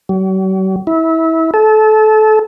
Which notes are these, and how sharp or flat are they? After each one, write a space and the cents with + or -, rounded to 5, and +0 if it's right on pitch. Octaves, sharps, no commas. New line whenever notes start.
F#3 +45
E4 -25
A4 -25